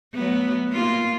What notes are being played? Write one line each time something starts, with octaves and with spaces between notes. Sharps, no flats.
F#3 A3 B3
A#3 F4